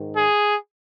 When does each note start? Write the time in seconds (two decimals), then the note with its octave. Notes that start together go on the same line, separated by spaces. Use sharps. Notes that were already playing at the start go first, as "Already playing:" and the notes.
Already playing: G#2 D#3
0.17 G#4